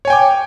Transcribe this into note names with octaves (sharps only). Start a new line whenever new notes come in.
C#5 G5 G#5 D6